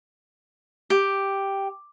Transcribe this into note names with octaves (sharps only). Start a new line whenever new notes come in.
G4